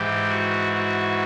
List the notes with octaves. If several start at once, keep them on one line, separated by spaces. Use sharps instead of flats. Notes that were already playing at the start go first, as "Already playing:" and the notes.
Already playing: G#2 E3 G4
F#4
F#4